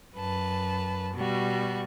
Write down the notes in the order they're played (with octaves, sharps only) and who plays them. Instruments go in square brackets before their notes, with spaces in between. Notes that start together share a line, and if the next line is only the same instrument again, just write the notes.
[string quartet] F#2 B4 A5
B2 G3 F#4